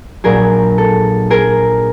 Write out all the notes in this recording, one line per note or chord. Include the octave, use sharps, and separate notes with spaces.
A#1 A#2 F#3 G#4 A#4
A4
G#4 A#4